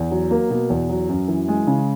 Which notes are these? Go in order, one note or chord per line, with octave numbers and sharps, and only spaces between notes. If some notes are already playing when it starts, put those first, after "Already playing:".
Already playing: E2
F#3
A#3
B2
E2
F#3
F#2
E3
G#3
C#3